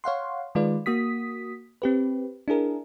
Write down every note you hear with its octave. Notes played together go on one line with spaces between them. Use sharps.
C#5 F5 F#5 C6
D#3 G#3 F4 B4 D5
A#3 F#4 D#6 B6
C4 G4 B4
D4 E4 G#4 A#4